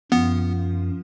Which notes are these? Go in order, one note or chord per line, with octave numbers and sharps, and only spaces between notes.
F#2 F3 B3